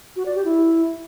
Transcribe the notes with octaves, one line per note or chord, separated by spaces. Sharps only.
F#4
D5
G4
E4